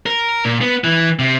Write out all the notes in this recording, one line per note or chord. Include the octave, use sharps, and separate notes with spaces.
A#4
A#2
B3
E3
C3